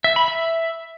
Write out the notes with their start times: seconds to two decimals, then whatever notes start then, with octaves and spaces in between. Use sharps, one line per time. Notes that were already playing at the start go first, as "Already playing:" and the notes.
0.04 E5
0.16 B5
0.28 E5